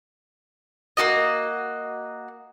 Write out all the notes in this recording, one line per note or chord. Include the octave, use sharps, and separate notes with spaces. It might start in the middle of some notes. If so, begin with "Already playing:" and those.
A#3 C#4 F#4 D#5